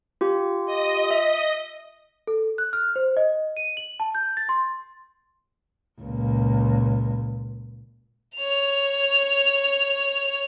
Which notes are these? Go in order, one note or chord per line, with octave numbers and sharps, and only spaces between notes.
F4 G4
D#5
E5
A4
F#6
F6
C5
D#5
D#7
F#7
A5
G6
A6
C6
C#2 A#2
C#5 F7